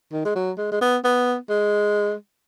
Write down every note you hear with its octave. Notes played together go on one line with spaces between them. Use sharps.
D#3
G#3
F#3
G#3
G#3
B3
B3
G#3